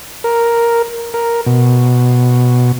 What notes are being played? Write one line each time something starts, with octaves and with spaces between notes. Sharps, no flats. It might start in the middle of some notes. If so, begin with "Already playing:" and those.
A#4
A#4
B2